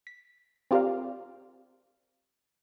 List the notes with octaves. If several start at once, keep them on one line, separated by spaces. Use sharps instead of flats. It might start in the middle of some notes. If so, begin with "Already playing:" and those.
B6
C4 F4 G4 A#4 D5 F5